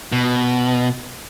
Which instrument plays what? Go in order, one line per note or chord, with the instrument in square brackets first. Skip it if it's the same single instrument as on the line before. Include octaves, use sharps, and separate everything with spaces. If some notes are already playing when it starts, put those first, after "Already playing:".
[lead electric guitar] B2